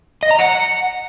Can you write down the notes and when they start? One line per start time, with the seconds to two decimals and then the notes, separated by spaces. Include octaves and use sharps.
0.23 D#5
0.31 A#5
0.39 F#5